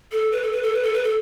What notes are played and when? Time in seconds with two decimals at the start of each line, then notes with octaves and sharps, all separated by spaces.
0.12 A4
0.32 B4
0.42 A4
0.52 B4
0.63 A4
0.73 B4
0.83 A4
0.93 B4
1.03 A4